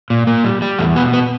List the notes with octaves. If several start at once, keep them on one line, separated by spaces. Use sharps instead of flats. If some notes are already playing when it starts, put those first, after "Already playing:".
A#2
A#2 A#3
G3
G3
E2 A3
B2 B3
B3